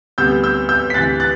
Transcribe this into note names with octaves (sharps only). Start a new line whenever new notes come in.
D2 C3 G3 B3 E6 G6
E6 G6
E6 G6
B6
D2 C3 E3 F#6 A6
F#6 A6